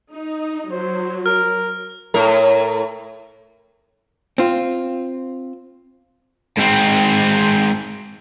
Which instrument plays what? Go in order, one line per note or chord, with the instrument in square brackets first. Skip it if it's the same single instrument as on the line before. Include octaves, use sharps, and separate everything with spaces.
[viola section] D#4
[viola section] F#3 [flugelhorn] C5
[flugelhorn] A#4 [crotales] F6
[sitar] A2 A#4
[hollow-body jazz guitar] C4 F4
[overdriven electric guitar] G#2 C4